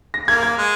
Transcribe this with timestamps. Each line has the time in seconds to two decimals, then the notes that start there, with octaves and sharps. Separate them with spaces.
0.14 A#6
0.28 A#3 G#6
0.43 G#6
0.58 G#3